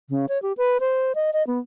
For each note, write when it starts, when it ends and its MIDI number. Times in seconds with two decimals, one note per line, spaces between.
0.10 0.26 49
0.29 0.41 73
0.42 0.53 67
0.57 0.78 71
0.80 1.13 72
1.15 1.31 75
1.33 1.45 75
1.47 1.59 59